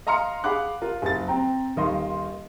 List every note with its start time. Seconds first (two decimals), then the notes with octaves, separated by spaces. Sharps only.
0.07 D#5 F5 A#5 C6 F6 C#7
0.44 G#4 F5 F#5 B5 D6 F#6
0.82 F4 A#4
1.02 F#1 A6
1.28 C4 G5 A#5
1.77 D#1 D#3 D#5 F5 C6